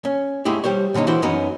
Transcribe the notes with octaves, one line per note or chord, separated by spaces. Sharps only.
C#4
G#3 A3 E4 G4
G3 G4 C5 C#5
A#2 D3 F#3 C#4 D#4
E3 G#3 E4 F#4 C5
F#2 F#3 B3 C#4 D#4